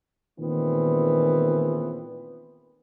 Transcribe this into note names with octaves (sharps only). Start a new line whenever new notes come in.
A#2 D#3 E3 G#3 B3 C4